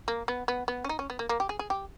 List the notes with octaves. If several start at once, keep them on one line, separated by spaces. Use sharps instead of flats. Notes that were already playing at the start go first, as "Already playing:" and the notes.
A#3
B3
B3
B3
C#4
D#4
C#4
B3
A#3
A#3
G4
G#4
G#4
G4